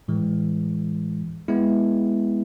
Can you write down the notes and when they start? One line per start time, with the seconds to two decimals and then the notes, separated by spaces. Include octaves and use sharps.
0.08 A2 E3 G#3
1.48 G#3 B3 E4